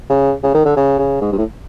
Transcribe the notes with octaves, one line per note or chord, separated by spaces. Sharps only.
C#3
C#3
D#3
D3
C#3
C#3
G#2
G2
A2